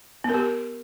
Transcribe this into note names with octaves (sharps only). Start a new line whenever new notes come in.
B3 G4 A#4